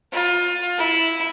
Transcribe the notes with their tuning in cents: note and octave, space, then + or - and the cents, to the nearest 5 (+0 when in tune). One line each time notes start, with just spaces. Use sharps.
F4 +25
E4 -5